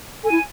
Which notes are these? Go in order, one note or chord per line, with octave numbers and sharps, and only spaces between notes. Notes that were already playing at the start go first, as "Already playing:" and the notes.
A4 G#5
E4